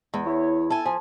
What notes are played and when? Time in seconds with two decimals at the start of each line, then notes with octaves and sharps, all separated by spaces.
0.14 E2 G#3
0.26 E4 C#5
0.70 A4 G#5
0.85 F3 G#5